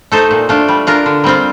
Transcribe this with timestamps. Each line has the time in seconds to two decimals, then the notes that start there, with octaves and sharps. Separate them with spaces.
0.12 A3 D#4 A4 C5
0.31 A#2
0.49 A3 D4 F4
0.68 G3
0.87 D4 F4 A#4
1.06 D3
1.24 G3 C4 F4